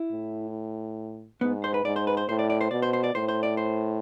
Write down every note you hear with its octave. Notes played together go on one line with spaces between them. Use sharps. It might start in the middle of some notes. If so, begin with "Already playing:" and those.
Already playing: E4
A2
G#2 B3
C5
B4
G#2 D5
C5
B4
C5
A2 C5
D5
D5
C5
B2 D5
C5
C5
D5
A2 C5
C5
D5
C5